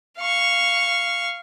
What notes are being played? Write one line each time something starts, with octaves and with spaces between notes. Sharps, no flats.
F5 C#6